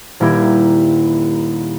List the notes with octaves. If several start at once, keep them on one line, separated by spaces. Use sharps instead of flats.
D#1 A#3 E4 G4 G#6